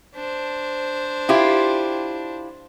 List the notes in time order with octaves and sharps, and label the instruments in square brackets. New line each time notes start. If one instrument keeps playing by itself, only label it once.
[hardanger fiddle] D4 C5
[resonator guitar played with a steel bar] E4 F4 G4